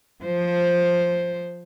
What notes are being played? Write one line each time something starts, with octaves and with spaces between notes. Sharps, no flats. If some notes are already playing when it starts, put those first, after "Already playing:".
F3 C5